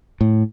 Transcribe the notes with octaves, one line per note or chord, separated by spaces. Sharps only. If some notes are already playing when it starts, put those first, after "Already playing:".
A2